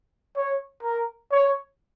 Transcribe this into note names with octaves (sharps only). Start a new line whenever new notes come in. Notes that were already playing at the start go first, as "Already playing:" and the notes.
C#5
A#4
C#5